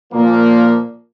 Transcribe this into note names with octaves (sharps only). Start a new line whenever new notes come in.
A#2 F3 A#3